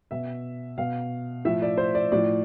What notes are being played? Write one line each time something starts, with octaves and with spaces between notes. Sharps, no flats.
B2 E5
B2 F5
A2 F3 E5
D5
C5
D5
A2 F3 D5